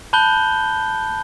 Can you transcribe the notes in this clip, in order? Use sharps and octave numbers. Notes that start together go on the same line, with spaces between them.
A5 B5 F#6 G6 G7